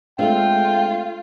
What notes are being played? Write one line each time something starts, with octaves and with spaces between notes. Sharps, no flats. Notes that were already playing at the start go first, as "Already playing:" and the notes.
G#3 A3 C4 D4 F4 G5